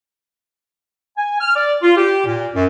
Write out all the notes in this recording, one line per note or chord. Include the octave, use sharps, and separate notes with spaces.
G#5
F6
D5
F4
G4
A#2
F#2